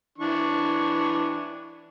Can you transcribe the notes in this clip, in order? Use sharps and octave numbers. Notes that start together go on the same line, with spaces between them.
E3 D4 C#6